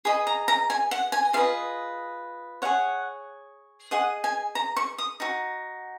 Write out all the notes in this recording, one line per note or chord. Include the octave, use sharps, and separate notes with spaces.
G#4 D#5 B5
A#5
A#5
G#5
F#5
G#5
F4 G#4 B4 D#5 F5
G#4 C#5 F#5
G#4 D#5 F#5
G#5
A#5
C#6
D#6
D#4 F#4